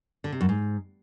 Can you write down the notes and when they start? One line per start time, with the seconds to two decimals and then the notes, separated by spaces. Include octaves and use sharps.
0.24 D3
0.32 C3
0.41 F#2
0.49 G#2